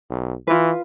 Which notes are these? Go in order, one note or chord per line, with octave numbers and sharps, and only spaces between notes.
B1
E3 F4 B4